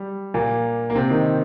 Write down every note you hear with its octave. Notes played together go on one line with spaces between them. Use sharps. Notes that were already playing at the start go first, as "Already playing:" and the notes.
Already playing: G3
A#2 A#3
A#3
C3 C4
D#3 D#4